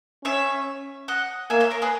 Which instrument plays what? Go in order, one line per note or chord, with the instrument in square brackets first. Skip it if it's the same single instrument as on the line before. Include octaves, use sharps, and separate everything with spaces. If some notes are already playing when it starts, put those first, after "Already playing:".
[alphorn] C#4 [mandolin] C#5 E5
[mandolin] D#5 F#5
[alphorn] A#3 [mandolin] E5 G#5
[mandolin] C#5 E5
A#4 C#5
G#4 B4